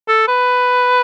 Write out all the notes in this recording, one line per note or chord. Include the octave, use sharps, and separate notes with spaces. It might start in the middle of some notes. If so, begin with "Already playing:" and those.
A4
B4